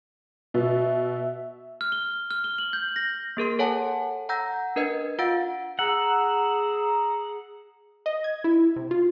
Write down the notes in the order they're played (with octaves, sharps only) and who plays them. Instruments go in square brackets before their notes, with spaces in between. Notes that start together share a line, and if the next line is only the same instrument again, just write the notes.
[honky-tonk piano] B2 [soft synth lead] E5
[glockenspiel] F6
G7
F6
G7
F#7
G6
A#6
[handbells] A#3 G#4 A#4 C6
A4 C#5 F#5 G#5 A5
F#5 A#5 E6 G6 A#6
D4 A#4 B4 D#5 G#6
F4 F5 F#5 E6 A6 D7
[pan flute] G#4 [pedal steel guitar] F#5 [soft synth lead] A#5 [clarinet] E6
[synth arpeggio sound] D#5
G#6
E4
C3
F4